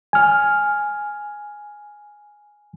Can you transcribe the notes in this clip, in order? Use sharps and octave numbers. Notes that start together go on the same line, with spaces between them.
G#5 F6